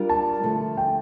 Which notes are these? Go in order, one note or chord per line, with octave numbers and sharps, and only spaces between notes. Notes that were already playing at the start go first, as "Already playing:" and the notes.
Already playing: G3 D4 F4 A#4
A5
D3 F3 A3
G5